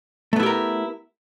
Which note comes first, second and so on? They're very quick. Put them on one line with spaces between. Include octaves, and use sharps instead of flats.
A3 B3 E4 G4 A#4